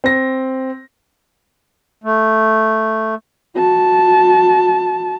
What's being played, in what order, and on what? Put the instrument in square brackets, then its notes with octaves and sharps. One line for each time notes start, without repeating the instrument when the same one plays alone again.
[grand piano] C4 A#6
[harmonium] A3
[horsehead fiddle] F#4 A5